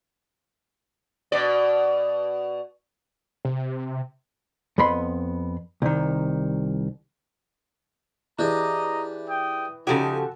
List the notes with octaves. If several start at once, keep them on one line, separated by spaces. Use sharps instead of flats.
B2 D5
C3
F2 B3 B5 C6
C2 D#3
E3 D4 G4 G#4 D#5 A#5
G5 D#6
C#3 F3 D#4 F#4 G4 A4 G#5